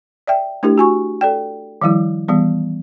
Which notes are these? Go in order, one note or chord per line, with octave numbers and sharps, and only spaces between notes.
D5 E5 G5
A3 D4 E4 G4 A#4
F#4 G#5 C#6
A4 D5 G5
D#3 F3 G3 E4
E3 G3 B3